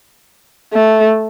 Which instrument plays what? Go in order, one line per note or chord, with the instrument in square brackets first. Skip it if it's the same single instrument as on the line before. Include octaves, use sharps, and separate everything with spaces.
[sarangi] A3